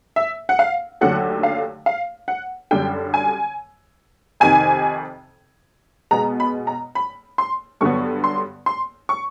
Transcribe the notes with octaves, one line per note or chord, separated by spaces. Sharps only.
E5
F#5
F5
D#2 D3 F#3 A3 F#5
F5
F5
F#5
F#2 D3 G3 G5
G#5
F2 C3 D#3 G#5
B2 G#3 B3 A#5
B5
A#5
B5
C6
G2 D3 F#3 B3 C#6
C6
C6
C#6